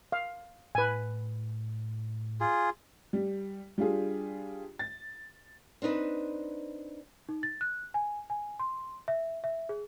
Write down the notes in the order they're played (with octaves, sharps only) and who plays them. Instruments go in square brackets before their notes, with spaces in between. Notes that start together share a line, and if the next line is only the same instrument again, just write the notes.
[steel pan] F5
[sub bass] A2 [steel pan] B4 G#5
[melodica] F4 G#4
[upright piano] G3
G3 D4 F4 G#4
A6
[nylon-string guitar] C4 D4 D#4 B4
[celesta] D#4
A6
F#6
G#5
G#5
C6
E5
E5
G#4